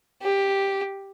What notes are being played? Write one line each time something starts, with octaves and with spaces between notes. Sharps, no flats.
G4